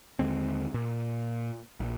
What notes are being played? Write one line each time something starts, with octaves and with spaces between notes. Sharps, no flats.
D#2 D3 G#3 C4
A#2
A#1